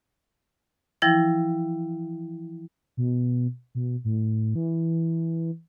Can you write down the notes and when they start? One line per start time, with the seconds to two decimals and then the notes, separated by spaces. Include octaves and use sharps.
1.02 E3 F3 E4 G5 A#6
2.97 B2
3.75 B2
4.04 A2
4.55 E3